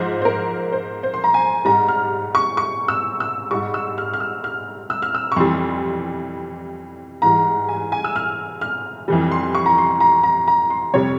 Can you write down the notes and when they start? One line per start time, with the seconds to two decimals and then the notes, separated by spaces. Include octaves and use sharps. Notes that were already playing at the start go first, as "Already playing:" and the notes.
Already playing: G#2 F3 C5
0.22 C5
0.25 A#4
0.72 C5
1.03 C5
1.14 C6
1.24 A#5
1.34 G#5
1.65 G#2 G3 A#5
1.88 F6
2.35 C#6
2.57 C#6
2.88 E6
3.20 E6
3.51 G#2 G3 C#6
3.74 E6
3.98 F6
4.13 F6
4.20 E6
4.44 F6
4.90 E6
5.02 F6
5.15 E6
5.32 C#6
5.36 F2 E3 G3 C6
7.22 G#2 E3 G3 A#5
7.68 G#5
7.92 G#5
8.04 E6
8.16 F6
8.61 F6
9.08 F2 E3 G3
9.32 C6
9.55 C#6
9.66 A#5
9.78 C6
10.00 A#5
10.23 A#5
10.48 A#5
10.70 C6
10.94 F2 C3 G3 C#5